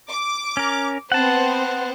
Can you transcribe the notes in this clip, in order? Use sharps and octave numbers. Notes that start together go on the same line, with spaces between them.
D6
C#4 A#4
B3 C4 C5 F#5 A5